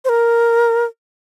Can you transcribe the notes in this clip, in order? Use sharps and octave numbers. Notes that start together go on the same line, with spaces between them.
C5
A#4